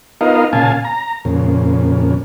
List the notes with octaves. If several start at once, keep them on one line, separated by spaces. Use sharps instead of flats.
B3 D#4 F4 A#4 D#5 F5
A#2 C#3 F5 G#5 A5
A#5
F2 A#2 C#3